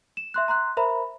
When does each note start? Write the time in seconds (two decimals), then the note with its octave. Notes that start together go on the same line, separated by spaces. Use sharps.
0.17 E7
0.34 E5 C6 F#6
0.48 A#5 C6 F#6
0.77 A#4 C5 E5 A#5 B5